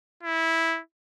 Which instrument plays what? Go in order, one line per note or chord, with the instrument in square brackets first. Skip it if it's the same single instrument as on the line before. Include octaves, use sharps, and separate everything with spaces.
[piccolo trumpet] E4